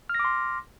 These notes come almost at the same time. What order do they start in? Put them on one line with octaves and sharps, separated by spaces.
F6 A#6 D6 C6